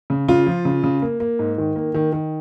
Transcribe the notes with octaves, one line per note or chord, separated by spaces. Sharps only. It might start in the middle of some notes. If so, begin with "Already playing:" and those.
C#3
C#3 F4
F3
C#3
C#3
A#3
A#3
G#2
D#3
A#3
D#3
D#3